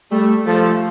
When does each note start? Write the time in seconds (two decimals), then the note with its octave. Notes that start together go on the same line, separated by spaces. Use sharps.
0.11 G3 A3 A4
0.46 F3 A3 A4